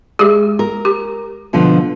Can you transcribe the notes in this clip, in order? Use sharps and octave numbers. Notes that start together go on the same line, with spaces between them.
G#3 G4 G#4
A#4
G4
B2 D3 F3